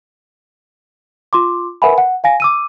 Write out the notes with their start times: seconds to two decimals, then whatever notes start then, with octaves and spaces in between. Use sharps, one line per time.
1.33 F4 C6 D6
1.82 A#4 B4 E5 F#5 G#5 B5
1.98 F#5
2.24 F5 G#5 A#6
2.40 D6 E6 D#7